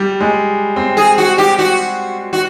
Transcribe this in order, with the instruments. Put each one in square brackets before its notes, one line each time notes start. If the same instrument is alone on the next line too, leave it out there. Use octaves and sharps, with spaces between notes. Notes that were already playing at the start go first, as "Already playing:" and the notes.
Already playing: [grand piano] G3
G#3
C4
[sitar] G#4
F#4
G4
F#4
F#4